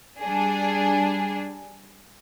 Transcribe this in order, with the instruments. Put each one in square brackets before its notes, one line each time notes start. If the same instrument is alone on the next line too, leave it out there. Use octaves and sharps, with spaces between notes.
[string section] G3 D4 G#4